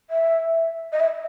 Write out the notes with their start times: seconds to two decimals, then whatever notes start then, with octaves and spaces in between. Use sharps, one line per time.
0.10 E5
0.93 D#5
1.00 E5